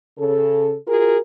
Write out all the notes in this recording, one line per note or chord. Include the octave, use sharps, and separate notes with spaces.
C#3 A4
F4 F#4 G#4 A#4